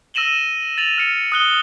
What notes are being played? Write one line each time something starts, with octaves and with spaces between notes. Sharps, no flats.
E6 A#6 D#7 E7 F#7 G7
A6 D#7 F7 F#7
F6 C#7
D#6 F#6 G7